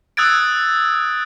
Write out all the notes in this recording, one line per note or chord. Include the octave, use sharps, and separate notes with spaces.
D#6 E6 F#6 G#6 A6 D7